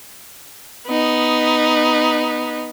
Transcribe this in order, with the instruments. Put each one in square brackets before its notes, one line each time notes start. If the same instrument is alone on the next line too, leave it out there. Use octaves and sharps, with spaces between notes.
[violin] B3 D#4